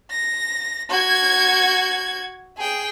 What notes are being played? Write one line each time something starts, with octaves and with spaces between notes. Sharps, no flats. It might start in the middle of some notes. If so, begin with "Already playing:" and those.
A#6
F#4 G#6
G#4 G5